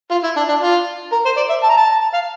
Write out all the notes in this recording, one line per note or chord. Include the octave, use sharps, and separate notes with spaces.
F4
E4
D4
D4
F4
A#4
C5
D5
E5
A5
A#5
A5
F5